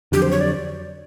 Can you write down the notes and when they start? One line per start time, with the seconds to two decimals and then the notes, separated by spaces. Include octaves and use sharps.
0.12 F2 D3 F#3 G4
0.22 C5
0.31 C#5
0.41 D5